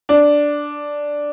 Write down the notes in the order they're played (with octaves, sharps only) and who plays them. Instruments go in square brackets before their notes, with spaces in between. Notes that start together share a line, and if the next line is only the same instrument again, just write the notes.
[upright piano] D4